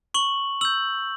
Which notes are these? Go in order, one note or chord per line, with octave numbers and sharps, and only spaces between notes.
C#6 F#7
E6 G6 F#7